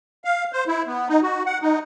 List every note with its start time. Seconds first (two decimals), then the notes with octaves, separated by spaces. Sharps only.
0.25 F5
0.53 C5
0.68 E4
0.87 B3
1.09 D#4
1.22 F#4
1.46 F#5
1.62 D#4